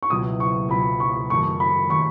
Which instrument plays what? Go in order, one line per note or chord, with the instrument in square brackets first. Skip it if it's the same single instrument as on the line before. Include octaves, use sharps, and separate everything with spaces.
[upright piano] C#6
[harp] C#2 B2 F#3 C#4 E4 [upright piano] D#6
[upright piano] C#6
[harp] C#2 B2 F#3 C#4 E4 [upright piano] B5
[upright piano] C#6
[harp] F#1 F#2 D#3 A3 [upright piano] C#6
[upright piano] B5
[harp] D#3 A3 [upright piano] C#6